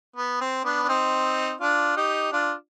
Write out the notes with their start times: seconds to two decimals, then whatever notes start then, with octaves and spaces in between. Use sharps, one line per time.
0.16 B3
0.41 C4
0.65 B3 D4
0.83 D4
0.89 C4 D#4
1.60 D4 F4
1.96 D#4 G4
2.32 D4 F4